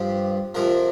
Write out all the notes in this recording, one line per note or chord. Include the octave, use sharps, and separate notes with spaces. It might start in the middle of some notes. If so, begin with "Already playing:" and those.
Already playing: G2 F3 G4
F2 C3 F3 A#4